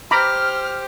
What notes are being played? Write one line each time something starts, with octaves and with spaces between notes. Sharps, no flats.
G4 C5 A#5 B5 D6 F6